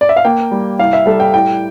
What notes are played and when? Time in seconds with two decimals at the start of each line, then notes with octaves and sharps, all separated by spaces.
0.01 D5
0.09 E5
0.16 F5
0.25 A#3 G5
0.52 G3
0.79 C2 F5
0.93 E5
1.06 G3 A4
1.20 G5
1.34 A2 G5